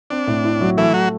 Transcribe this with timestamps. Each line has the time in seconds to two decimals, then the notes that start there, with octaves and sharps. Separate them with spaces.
0.10 C4 D4
0.27 A2
0.45 E4
0.61 F#3
0.77 E3 A3 E4
0.94 F#3 F#4